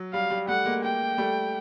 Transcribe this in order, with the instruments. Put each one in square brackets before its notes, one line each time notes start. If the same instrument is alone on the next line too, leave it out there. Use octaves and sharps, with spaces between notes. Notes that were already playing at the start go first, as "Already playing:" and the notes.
Already playing: [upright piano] F#3
[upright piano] G3 [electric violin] F5
[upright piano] G3
[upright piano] G3 A3 [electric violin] F#5
[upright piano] G#3 A#3
[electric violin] G5
[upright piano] G3 A3